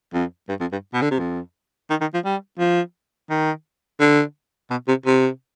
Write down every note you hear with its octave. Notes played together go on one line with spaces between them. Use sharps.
F2
G2
F2
G2
B2
D3
C3
F2
D#3
D#3
F3
G3
F3
D#3
D3
B2
C3
C3